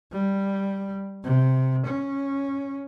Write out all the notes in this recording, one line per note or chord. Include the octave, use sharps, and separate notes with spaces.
G3
C3
C#4